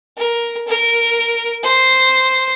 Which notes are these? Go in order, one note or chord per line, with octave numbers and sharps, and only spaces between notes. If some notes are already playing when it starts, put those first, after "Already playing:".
A#4
A#4
C5